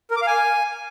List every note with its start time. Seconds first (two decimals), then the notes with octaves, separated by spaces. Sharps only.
0.11 A#4
0.16 D6
0.22 F5
0.27 G#5